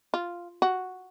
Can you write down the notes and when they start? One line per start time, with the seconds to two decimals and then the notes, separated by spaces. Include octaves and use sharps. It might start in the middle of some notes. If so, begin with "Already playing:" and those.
0.14 F4
0.62 F#4